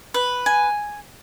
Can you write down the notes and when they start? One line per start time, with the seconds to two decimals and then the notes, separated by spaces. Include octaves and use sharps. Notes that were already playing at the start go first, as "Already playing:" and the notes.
0.14 B4
0.46 G#5